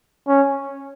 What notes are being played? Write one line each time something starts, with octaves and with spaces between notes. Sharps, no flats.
C#4